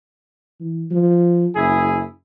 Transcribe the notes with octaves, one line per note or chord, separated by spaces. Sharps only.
E3
F3
F#1 E4 G#4